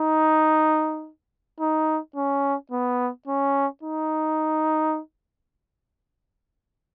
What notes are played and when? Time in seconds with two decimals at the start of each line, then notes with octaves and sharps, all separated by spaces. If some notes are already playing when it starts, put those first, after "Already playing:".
Already playing: D#4
1.60 D#4
2.16 C#4
2.71 B3
3.27 C#4
3.83 D#4